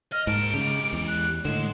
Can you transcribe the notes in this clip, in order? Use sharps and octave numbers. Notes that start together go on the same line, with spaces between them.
D#5 F6
G#2 A#3 A5 D7
C#3 G#3 G4
E2
F#6
A2 D3 G#3 E7